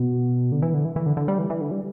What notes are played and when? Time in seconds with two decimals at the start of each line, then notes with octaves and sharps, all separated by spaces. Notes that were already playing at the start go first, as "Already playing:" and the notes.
Already playing: B2
0.52 D3
0.62 E3
0.74 D3
0.85 E3
0.96 E3
1.06 D3
1.17 D3
1.28 G3
1.39 E3
1.50 E3
1.61 D3
1.71 G3